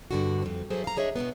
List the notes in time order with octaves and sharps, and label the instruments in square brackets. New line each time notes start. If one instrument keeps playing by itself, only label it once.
[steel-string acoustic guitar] G2 D3 F#4
F2 C4
E3 F#3 G#4 A4 C5 E5
F5 A#5
D4 G#4 C#5 D#5 E5
F2 B2 D3 B3